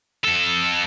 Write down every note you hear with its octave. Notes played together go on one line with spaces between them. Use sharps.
F2 A4